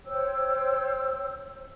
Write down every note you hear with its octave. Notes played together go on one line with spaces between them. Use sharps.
C5 C#5 G5 E6